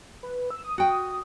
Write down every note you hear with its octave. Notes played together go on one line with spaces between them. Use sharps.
B4
E6
D#6
F#4 G5